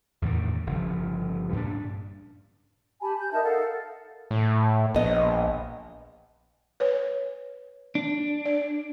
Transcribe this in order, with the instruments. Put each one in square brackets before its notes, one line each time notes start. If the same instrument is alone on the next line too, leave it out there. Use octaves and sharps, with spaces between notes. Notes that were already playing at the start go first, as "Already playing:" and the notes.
[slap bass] E2 A2 D3 D#3
G1 C#3 F3
G2 A#2 C#4 D4
[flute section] G4 G#5 A5 B5
G6
D#4 A#4 E5 A5
A4 A#4 F5 F#5
[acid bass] A2
[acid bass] A#1 [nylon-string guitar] B3 D#5
[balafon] B4 C#5
[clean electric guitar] D4
[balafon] D5